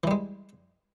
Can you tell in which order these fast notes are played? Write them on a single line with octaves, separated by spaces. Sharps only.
E3 G3 G#3